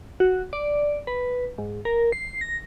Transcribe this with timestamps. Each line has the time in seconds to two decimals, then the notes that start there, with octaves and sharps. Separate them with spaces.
0.20 F#4
0.53 D5
1.07 B4
1.58 G#2
1.85 A#4
2.12 C7
2.41 A#6